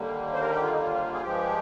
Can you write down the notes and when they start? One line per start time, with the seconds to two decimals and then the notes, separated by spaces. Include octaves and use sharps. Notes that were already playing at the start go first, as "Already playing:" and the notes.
Already playing: D#2 D3 G3 A#3
0.34 C5
0.41 A#4
0.51 G4
0.62 F4
0.71 D#4
0.82 F4
1.13 G#4
1.22 G2 F3 G#3 G4